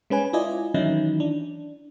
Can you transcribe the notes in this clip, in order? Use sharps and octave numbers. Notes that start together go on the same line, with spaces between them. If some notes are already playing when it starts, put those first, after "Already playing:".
G#3 C#4 B4 G#5
E4 F4 D5 D#5 G#5
D#3 E3 F#3 C#4 D#4 E4
D4